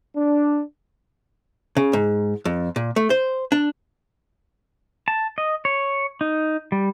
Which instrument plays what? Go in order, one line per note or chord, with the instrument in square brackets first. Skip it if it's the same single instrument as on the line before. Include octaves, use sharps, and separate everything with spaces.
[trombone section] D4
[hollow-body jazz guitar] C#3
G#2
F2
A#2
A3
C5
D4
[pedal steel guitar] A5
D#5
C#5
D#4
G3